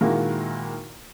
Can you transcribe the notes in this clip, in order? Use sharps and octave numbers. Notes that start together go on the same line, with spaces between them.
A#2 D#3 G#3 A#3 E4 F#4